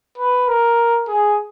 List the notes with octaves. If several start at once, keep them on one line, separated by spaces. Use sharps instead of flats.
B4
A#4
G#4